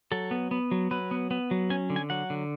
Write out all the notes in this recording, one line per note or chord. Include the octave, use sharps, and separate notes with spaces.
F#3 A4
B3
B3
F#3
F#3 B4
B3
B3
F#3
C#4 G#5
D3
G#5
F#3 F#5
D3